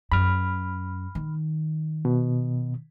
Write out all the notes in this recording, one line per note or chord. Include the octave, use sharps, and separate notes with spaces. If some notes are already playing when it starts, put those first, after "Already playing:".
F#2 B5 F6
D#3
B2